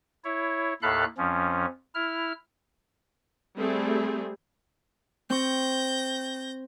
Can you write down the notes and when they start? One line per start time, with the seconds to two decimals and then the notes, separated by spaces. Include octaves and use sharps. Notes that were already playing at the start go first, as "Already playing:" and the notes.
0.24 E4 C#5
0.82 D#2 A2 A4 F5 B5 F#6
1.18 F2 F3 C#4
1.95 E4 F6
3.57 G3 A3 C4 G#4
5.30 C4 C#6 G6 A#6